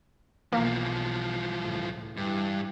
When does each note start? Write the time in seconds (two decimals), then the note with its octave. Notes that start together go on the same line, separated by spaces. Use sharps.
0.53 B1 E3 F3 A#3
1.59 C#2 A2
2.17 G2 E3